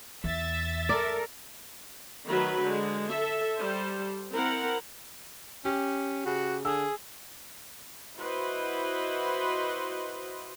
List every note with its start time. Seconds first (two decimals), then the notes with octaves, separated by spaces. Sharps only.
0.24 E2 E5 A6
0.89 A4 A#4 D5
2.27 D#3 F#3 A3 B4
2.61 D3 G#3
3.10 A4 E5
3.58 G3 A4 C5
4.32 C4 E4 A#4 F#5
5.65 C#4 G4
6.26 C#3 F#4
6.65 D3 G#4 E6
8.18 E4 F#4 B4 C5 D#5